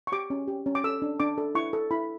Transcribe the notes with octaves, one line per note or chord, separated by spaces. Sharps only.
C#6
G4 D6
C#4
G4
C#4
D6
A4 E6
D4
D4 D6
A4
E4 C#6
A4
E4 B5